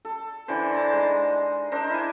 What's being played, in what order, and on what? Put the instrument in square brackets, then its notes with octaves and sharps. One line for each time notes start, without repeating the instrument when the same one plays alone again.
[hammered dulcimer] A4
D3 E3 C5
A5 A#5 C6
G#3 D#4
D4 D#4 A#4 C5
E4 G#5